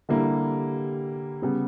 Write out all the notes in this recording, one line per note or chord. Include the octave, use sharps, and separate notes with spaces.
D3 G3 A#3 E4
C#3 G3 B3